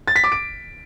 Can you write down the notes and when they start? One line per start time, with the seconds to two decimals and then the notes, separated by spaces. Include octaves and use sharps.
0.08 A6
0.16 B6
0.24 D6
0.32 D7